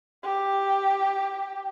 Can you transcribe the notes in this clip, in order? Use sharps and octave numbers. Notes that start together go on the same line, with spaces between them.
G4